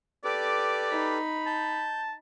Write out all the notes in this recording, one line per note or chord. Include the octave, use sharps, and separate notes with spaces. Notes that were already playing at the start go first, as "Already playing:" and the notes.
G4 A4 B4 D5 D6
D#4 B5
A5 G6